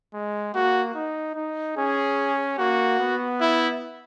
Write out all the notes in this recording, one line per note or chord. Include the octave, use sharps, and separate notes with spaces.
G#3
A#3 F#4
D#4
D#4
C#4 G#4
A#3 F#4
B3
E4